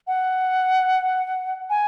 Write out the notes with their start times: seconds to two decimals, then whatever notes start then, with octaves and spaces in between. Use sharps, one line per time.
0.07 F#5
1.70 G#5